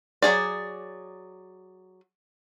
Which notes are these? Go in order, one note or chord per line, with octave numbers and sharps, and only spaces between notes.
F#3 C#4 G#4 D5